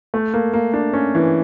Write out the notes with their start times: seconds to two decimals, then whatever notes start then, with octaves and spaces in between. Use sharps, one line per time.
0.14 A3
0.34 A#3
0.54 A#3
0.74 D4
0.93 C#4
1.15 E3